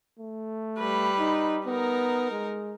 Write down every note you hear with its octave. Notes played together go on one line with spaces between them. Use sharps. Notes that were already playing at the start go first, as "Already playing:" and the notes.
A3
G3 B4
D#4
B3 D#4 A#4
G#3